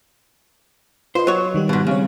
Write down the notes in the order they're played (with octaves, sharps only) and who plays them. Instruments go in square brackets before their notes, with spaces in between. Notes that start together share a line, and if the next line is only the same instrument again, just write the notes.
[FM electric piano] F4 B4 D#5 [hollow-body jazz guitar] C5
[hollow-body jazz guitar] F#3 C#5
[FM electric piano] D#3 G3 G4
[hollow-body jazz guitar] G#2 B2
[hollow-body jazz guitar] C#3 [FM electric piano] G3 C4 C#5